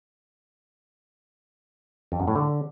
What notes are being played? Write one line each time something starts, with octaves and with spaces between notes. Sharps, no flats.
F2
F#2
A2
D3